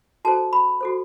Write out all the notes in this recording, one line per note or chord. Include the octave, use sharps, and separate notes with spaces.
F#4 A4 C5 A5
B5
F#4 A4 C5